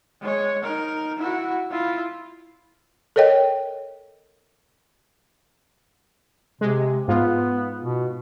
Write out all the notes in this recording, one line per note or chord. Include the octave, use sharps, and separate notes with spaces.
G#3 C#5
D#4 A#4
E4 F#4
E4 F4
A4 A#4 C#5 D#5 G5
C3 G#3
G#2 B3 F4
B2